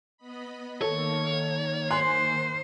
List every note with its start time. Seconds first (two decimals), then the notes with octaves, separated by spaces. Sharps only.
0.17 B3 D#5 B5
0.82 D#3 A#3 A4 C#5
1.91 C5 G#5 C6 F#6